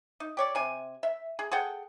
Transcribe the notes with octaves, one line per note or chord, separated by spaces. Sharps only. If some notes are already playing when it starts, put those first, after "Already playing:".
D#4
G4 C#5 D5
C3 G#5
E5
G#4
G#4 A4 F#5 G5